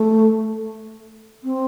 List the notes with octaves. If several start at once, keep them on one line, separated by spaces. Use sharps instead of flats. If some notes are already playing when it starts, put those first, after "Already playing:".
Already playing: A3
C4